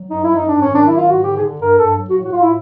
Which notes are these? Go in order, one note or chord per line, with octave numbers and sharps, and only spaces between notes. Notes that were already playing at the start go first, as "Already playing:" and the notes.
Already playing: F#3
F#2 D#4
E4
F#2
D#4
G#2 D4
C#4
D#3
D4
F#3 E4
F4
G#2
F#4
D3 G4
G#4
D3
G2 A#4
G2 A4
F#3
F#4
A2
F#4
A2 F4
E4